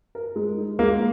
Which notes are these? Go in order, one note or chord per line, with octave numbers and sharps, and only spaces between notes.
A#4
G#3
D#4
G#3 A#3